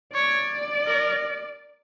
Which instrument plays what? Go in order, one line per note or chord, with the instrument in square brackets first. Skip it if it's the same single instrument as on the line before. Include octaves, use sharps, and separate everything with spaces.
[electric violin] C#5 [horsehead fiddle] D5
[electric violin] A#4